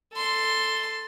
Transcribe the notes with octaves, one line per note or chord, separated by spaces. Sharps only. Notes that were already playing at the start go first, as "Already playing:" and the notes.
A4 C6